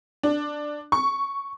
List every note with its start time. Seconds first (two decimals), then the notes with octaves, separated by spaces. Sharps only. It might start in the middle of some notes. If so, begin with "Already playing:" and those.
0.23 D4
0.92 C#6